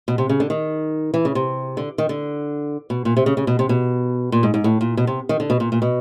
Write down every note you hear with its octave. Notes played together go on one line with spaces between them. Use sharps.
B2
C3
C#3
D3
D#3
E3
C#3
C3
D3
D#3
D3
B2
A#2
C3
C#3
C#3
B2
C3
B2
A#2
G#2
G#2
A2
A#2
B2
C3
D#3
D3
B2
A#2
A#2
B2